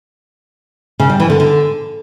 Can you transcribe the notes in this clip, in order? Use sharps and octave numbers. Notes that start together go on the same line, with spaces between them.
C#3
G3
E3
D3
D3